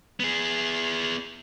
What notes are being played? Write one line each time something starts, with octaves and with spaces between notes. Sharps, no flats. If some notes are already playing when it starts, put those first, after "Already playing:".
B3 G#4